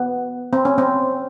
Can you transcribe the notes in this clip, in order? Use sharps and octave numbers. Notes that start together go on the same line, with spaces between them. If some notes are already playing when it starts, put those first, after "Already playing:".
Already playing: B3
C4
C#4
C4